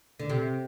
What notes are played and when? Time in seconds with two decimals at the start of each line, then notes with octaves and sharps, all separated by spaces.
0.19 D3
0.30 C3